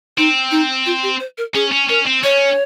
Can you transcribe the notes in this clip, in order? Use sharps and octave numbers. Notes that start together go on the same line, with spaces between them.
C4 D#4
D#4
F4
G4
C5
A#4
C#4 G#4
C#4
C#4 A#4
C4
C#4 C#5